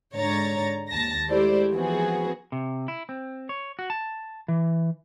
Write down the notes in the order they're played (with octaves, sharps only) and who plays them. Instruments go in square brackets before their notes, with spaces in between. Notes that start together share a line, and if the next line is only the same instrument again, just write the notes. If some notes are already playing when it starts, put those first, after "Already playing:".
[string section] G#2 D3 C#5 A#5 A6
D#2 A5 A#6
G#3 A3 E4 G4 C5 D5
E3 F3 B3 C4 F#4 G#4
[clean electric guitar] C3
E4
C4
C#5
F#4
A5
E3